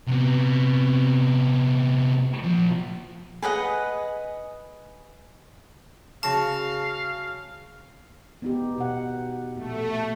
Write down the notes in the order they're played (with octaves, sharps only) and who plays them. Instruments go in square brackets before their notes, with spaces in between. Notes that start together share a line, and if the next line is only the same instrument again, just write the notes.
[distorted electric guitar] C3 B3
A#2 F3
[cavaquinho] G#4 B4 D#5 F#5
[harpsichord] C#3 F#4 C#6 [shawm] F5 [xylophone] A5
[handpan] B3 D#4 G4
B2 F#5
[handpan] A#2 [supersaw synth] A3